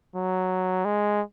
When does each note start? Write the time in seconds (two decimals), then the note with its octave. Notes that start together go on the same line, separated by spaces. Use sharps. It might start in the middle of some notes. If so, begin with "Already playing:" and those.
0.15 F#3
0.85 G#3